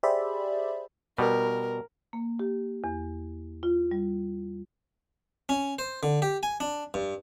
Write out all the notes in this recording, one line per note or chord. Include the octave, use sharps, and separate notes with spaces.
G4 G#4 C5 D5 E5 B5
B2 G3 A#4
A#3
G4
E2
F4
G3
C#4
C5
D3
G4
G#5
D4
G2